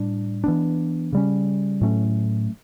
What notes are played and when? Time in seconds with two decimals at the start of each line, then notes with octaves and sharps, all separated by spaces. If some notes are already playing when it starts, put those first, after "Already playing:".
Already playing: A2 G3 D4
0.44 E3 B3 D4
1.13 C#3 G3 C#4
1.81 A2 F#3 A3 C#4